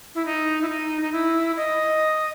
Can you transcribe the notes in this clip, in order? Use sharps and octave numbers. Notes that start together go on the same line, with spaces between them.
E4
D#4
E4
D#4
D#4
E4
D#5